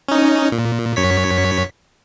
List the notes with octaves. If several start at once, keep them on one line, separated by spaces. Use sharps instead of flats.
C#4 D#4
A#2
F#2 C#5 B6